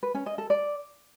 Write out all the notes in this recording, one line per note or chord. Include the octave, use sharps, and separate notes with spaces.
B4
C#4
D#5
A4
D5